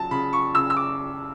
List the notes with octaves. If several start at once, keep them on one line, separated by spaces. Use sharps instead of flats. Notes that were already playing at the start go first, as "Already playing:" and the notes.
Already playing: C#3 F#3 A5
C#3 B5
C#6
C#3 E6
E6
D6